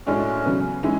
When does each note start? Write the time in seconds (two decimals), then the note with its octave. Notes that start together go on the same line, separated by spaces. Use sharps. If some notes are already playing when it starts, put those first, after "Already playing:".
0.06 A2 G#3 C#4 D4 F#4
0.45 C#3 F#3 B3
0.83 E3 G#3 C#4 E4